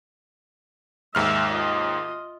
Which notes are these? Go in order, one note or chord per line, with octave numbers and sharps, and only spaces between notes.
D#2 G#2 E5 F6
F4 D#5